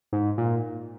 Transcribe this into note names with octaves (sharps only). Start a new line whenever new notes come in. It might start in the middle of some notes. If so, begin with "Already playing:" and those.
G#2
A#2